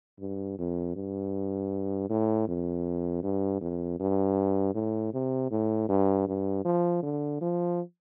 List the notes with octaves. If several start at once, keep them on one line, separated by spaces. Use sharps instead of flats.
G2
F2
G2
A2
F2
G2
F2
G2
A2
C3
A2
G2
G2
F3
D3
F3